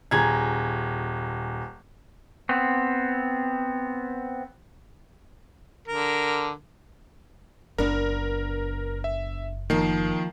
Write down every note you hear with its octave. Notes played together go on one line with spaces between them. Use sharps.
D#1 G#4 A#5 G#6
B3 C4
D3 A#4
F#1 B3 D4 A#4
E5
D#3 F3 A#3 C7